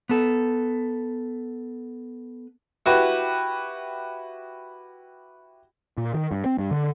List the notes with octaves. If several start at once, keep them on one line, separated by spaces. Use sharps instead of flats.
B3 A4
E4 F#4 G4 B4
A#2
D#3
G2
C4
G2
D3